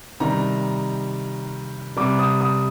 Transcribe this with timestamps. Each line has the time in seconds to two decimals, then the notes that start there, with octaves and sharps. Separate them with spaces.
0.20 C3 D#3 G3 A#5
1.97 C3 G3 D6
2.19 D#6
2.41 D#6